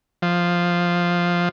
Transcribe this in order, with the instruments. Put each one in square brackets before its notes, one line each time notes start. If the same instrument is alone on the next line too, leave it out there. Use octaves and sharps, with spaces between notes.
[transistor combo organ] F3